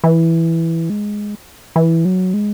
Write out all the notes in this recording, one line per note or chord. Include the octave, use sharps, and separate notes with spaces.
E3
G#3
E3
F#3
G#3